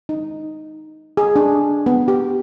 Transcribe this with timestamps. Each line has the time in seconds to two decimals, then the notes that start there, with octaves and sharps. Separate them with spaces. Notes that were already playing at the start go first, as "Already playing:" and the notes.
0.09 D#4
1.17 G#4
1.36 D4
1.86 B3
2.08 G4